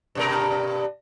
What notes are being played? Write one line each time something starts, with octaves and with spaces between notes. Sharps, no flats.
G2 B2 A#4